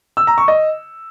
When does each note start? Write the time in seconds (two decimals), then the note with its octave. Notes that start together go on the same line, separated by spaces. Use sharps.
0.17 E6
0.27 A#5
0.38 C#6
0.48 D#5